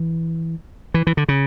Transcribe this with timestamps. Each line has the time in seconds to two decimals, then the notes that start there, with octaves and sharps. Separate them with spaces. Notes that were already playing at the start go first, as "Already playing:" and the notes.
Already playing: E3
0.94 E3
1.07 E3
1.17 D3
1.28 C#3